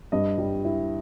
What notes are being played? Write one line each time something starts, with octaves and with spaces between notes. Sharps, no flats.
G2 D#5
G3
E4